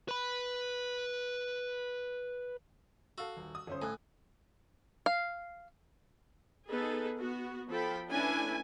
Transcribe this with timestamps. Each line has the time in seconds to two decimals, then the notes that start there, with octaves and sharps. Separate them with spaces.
0.08 B4 B5
3.18 F#4 A4 F5 E6
3.37 D#1
3.55 D#6
3.67 G1 C#4 C5
3.82 A2 G#5 F#6
5.06 F5
6.69 B3 D#4 G#4 A4 B4
7.18 B3 F#4
7.70 F3 A4 G5 B5
8.10 A3 C#4 D4 E4 B4 G#5